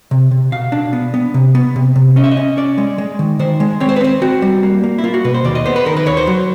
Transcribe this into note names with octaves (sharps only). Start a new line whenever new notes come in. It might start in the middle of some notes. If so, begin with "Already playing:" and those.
C3
C3
B2 F5
D4
B3
B3
C3
B3
C3
C3
C#4 D#5
E5
D#5
C#4
C#4 D5
G#3
G#3
D#3
D#3 C5
G#3
C4 C#5
C5
B4
C4 C5
C4 F#4
G3
A#3
A#3
E4
A#3 F4
F#4
B2 B4
C5
D#2 D5
D#5
B3 C5
B4
D#3 A#4
B4
D#2 C#5
C5
F#3